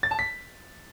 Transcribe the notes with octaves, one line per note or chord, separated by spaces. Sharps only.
A6
A5
B6